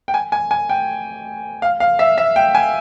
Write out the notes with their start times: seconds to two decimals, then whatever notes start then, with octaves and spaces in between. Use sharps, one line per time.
0.08 G5
0.14 G#5
0.32 G#5
0.51 G#5
0.69 G5
1.62 F5
1.80 F5
1.99 E5
2.18 E5
2.36 G5
2.55 G#5